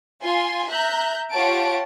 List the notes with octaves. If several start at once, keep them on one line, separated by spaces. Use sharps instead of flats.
F4 G#5 C6
E5 A#5 F#6 G6
F4 G4 C#5 F#5 A5 D7